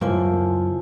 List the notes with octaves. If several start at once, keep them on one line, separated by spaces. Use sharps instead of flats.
C#2 F#2 F3 A#3 E4 G#5